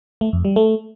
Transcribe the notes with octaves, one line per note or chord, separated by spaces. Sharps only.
A3
F2
G3
A3